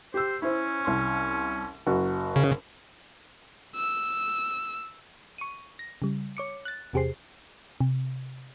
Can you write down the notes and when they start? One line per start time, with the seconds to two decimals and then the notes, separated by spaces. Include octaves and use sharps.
0.14 G4 C5 E6
0.42 C#4 E4 C5
0.85 C2 C6
1.87 F#1 F#4
2.36 C#3
3.76 E6
5.38 C#6 D#7
5.79 A#6
6.02 C#3 G3
6.37 C#5 D6 C#7
6.65 F#6 A6
6.93 E2 C3 G4 G#4 C5 C7
7.81 C3